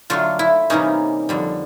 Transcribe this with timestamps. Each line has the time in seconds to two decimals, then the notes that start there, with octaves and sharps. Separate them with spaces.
0.10 D3 F#3 A3 D4 F4
0.39 E4
0.70 C3 E3 G3 A#3 C#4 D#4
1.29 F2 D3 G3